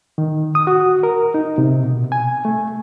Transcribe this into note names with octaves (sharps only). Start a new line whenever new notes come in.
D#3
D#6
F#4
A#4
D#4
C3
B2
G#5
A3